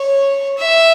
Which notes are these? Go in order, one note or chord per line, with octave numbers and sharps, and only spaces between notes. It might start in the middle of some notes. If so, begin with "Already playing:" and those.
Already playing: C#5
E5